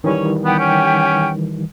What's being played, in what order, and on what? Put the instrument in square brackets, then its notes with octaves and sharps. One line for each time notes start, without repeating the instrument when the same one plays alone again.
[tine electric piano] D#3 E3 G3 [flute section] C#4 C#5 C#6
[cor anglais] B3 [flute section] G4 F#5 G5
[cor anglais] C#4